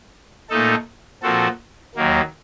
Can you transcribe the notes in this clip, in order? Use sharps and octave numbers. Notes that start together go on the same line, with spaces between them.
A#2 A3 D#4 A4
A#2 F3 C4 F#4 A4
D#2 D#3 F#3 A#3